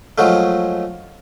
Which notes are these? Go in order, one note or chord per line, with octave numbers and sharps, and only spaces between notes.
F3 F#3 G#3 A3